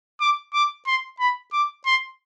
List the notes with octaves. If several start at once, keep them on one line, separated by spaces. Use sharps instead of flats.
D6
D6
C6
B5
D6
C6